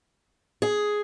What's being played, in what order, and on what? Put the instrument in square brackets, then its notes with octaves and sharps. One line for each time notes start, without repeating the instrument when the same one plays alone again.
[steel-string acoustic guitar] G#4